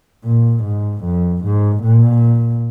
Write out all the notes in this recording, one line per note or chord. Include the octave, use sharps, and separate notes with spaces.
A#2
G#2
F2
G#2
A#2